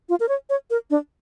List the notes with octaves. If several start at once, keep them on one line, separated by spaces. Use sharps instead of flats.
F4
A#4
C#5
C#5
A#4
D4